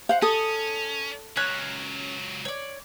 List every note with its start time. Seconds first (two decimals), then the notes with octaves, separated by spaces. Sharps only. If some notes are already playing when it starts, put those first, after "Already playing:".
0.09 C5 F5 F#5
0.22 C#4 A4 D#6
1.36 C#2 F#3 C#4 C#5 F#6
2.45 C#5 D5